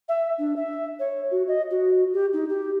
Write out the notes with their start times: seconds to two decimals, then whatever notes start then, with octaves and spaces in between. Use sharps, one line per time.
0.09 E5
0.39 D4
0.56 E5
0.99 C#5
1.31 F#4
1.48 D#5
1.71 F#4
2.13 G4
2.33 D#4
2.49 G4